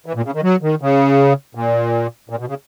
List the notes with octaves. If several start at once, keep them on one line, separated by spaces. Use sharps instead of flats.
E3
A#2
C#3
D#3
F#3
D#3
C#3
A#2
A#2
B2
C#3